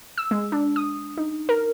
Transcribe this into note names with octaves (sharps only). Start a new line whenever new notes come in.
E6
G#3
D4
D#6
D#4
A#4